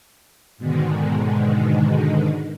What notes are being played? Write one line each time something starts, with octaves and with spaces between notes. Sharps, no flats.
G#2 B2 D3 D#3 G#3